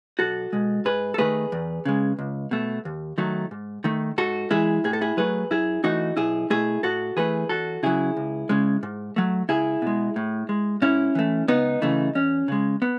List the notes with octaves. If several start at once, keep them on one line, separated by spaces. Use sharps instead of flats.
B1 F#4 A4
B2 G#3
G#2 G#4 B4
A4
D#3 F#3 A3 G#4 B4
E2
C#3 G#3
C#2
B2 A3
D#2
D#3 F#3 A3
G#2
D#3 A3
G#2 F#4 A4
E3 G#3 E4 G#4
A2 G#4
A4
E4 G#4
F#3 A3 G#4 B4
F#2 E4 G#4
E3 A3 D#4 F#4
B1 E4 G#4
B2 A3 E4 G#4
A2 F#4 A4
E3 A3 G#4 B4
E2 F#4 A4
C#3 F#3 E4 G#4
C#2
C#3 G#3
G#2
F#3 A3
C#2 E4 G#4
B2 G#3
A2
G#3
G#2 C#4 E4
E3 A3
C#2 B3 D#4
C#3 E3 A3
E2 C#4
C#3 G#3
B3